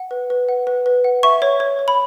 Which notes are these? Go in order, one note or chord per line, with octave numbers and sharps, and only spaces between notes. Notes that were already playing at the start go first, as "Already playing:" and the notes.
Already playing: F#5
B4
B4
F#5
B4
B4
F#5
E5 C#6
C#5
C#5
C#5
B5